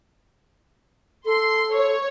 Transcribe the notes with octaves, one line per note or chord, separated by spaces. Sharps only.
A4 C6
C#5